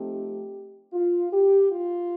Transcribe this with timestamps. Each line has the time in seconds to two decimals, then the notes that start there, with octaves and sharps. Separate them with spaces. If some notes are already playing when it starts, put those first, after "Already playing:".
Already playing: F3 A3 C4 D#4 G4
0.93 F4
1.33 G4
1.72 F4